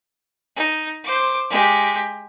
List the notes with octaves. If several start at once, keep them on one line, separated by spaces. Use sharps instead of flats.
D#4
C5 D6
G#3 G4